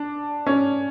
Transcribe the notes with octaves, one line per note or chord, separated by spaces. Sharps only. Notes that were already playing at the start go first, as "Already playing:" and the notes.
Already playing: D4
C#4